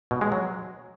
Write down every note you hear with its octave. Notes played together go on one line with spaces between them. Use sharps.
B2
G#3
F#3